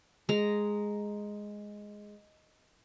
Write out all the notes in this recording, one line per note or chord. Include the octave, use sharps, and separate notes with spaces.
G#3 A#5